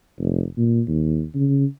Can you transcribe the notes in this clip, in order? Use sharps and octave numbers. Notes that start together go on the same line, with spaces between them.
F1
A#2
D#2
C#3